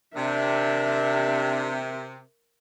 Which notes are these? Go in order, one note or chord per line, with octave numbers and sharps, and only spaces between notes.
C3 D4 A#4 E5